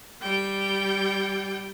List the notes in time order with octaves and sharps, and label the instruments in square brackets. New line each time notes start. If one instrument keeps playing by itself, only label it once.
[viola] G3 G5